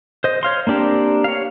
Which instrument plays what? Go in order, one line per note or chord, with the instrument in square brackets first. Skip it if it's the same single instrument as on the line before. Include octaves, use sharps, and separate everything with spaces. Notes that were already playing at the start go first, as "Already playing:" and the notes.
[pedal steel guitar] C5 D#5
C#5 F5 C6
A#3 C4 D4 G4 A#4
C#5 F5